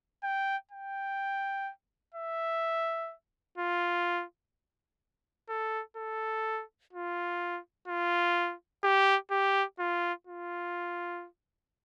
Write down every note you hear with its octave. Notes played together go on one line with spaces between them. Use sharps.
G5
G5
E5
F4
A4
A4
F4
F4
G4
G4
F4
F4